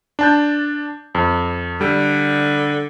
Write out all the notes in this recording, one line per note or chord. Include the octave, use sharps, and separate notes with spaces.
D4 A5 G6
F2
D3 G3